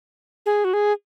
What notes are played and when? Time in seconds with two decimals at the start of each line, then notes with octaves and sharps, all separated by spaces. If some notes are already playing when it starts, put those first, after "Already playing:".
0.46 G#4
0.64 F#4
0.74 G#4